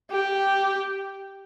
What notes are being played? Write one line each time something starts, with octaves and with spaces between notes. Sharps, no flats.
G4